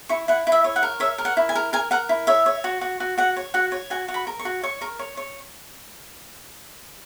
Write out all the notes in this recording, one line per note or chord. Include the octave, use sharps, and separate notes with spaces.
E4 C#6
E4 F#5
E4
E5
C#5
F#5
A#4
C#5 E5
A#4
F#5
E4
G#5
A#4
A#4 G#5
A#4 F#5
E4
C#5 E5
C#5
F#4
F#4
F#4
F#4 F#5
C#5
F#4 F#5
C#5
F#4 G#5
F#4
B5
A#4
C#6
F#4
C#5 C#6
A#4
C#5
C#5